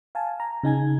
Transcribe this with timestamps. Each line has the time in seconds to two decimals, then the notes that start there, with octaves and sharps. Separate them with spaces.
0.15 F5 G#5 A5
0.40 A#5
0.63 C#3 D#4 G#5 G#6